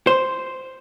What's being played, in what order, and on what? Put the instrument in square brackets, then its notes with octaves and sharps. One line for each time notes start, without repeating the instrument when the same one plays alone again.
[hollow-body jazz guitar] C5